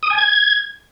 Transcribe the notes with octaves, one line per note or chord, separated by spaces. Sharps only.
D#6
G#5
G#6